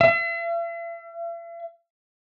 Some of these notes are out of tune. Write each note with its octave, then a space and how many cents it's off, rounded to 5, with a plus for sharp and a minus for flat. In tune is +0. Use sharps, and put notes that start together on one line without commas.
E5 +45